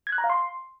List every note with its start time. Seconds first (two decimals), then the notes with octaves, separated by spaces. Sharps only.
0.07 G#6
0.12 F#6
0.18 A#5
0.24 F5
0.30 C6